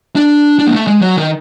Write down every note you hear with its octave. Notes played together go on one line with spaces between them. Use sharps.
D4
D4
A#3
A3
G#3
F#3
D#3